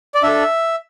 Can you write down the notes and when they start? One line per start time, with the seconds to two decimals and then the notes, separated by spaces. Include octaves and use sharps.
0.15 D5
0.23 D4 A4 E5